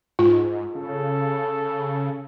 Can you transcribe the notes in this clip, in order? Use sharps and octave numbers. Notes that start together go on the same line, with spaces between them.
G#2 F4
C#3 A4